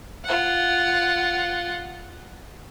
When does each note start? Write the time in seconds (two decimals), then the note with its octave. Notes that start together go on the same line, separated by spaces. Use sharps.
0.25 F4 F#5